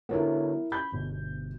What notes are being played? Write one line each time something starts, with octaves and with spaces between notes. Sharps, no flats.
D3 F#3 B3 E4 A#4
B5 G6
G1 B2